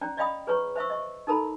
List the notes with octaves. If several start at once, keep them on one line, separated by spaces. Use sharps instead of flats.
C#4 D5 G5 A#5
D5 D#5 F5 G5 B5 D#6
G#4 B4 C#5 A#5 C#6
C5 E5 C#6 E6
D#5 C#6
D#4 A4 A#4 A#5 B5